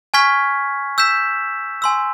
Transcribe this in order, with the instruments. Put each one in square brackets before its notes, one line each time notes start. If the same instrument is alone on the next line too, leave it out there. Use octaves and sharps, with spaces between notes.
[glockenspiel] G#5 C#6 F6 G#6 B6
E6 G6 B6 E7
G#5 C6 E6